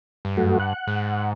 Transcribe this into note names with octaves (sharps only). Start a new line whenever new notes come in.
G2
F#2 A3 F#4
F#5
G#2